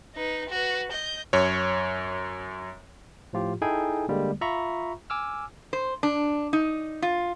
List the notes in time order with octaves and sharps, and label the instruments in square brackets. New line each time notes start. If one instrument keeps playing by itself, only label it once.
[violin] D#4 B4
F#4 B4
D#5 G6
[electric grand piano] F#2 C#5
[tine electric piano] A2 F3 F4 G4
D#4 E4 G#4 A4 G5 G#5
D3 G3 G#3 A#3
F4 E5 A#5 B5 C#6
G#5 D6 E6 F6
[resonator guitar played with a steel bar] C5
D4
D#4
F4